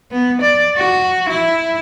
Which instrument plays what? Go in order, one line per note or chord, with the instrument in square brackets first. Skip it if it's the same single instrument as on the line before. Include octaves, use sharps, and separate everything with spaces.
[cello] B3
D5
F#4
E4